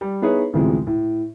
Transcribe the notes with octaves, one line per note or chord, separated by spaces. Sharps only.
G3
B3 D#4 E4 G#4 B4 C#5
A1 D2 A2 C3 F3 G#3
A2